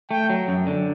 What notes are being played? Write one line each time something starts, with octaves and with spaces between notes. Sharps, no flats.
A3 G5
F#3
F#2
D3